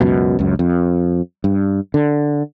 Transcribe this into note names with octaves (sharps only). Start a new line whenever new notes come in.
C#2 F#2 B2
C#2 F#2
F2
G2
D3